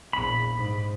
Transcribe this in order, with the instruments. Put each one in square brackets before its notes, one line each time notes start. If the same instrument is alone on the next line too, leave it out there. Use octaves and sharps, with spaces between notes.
[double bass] A#1 E2 [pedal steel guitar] B5
[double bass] G#2